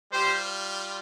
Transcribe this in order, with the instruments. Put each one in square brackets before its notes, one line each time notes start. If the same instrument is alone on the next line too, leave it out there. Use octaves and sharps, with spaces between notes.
[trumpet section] G3 F4 G4 C5